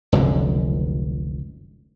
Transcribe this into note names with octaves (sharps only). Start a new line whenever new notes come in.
F1 C#2 F#2 D3